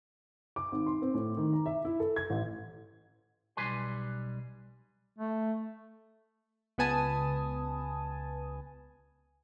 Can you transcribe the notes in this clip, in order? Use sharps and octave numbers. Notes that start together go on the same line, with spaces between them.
D6
G#1
C6
C4
A2
D#3
A#5
E5
E4
A4
G#6
A1
B1 G3 G4 B4 G#5 C6
A3
C#2 B3 B4 G#5 A5 D#6